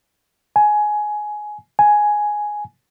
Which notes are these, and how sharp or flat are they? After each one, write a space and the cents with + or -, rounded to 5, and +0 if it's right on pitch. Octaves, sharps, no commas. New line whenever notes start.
G#5 +15
G#5 +5